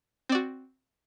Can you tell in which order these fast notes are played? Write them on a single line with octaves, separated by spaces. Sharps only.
C4 D5 F#4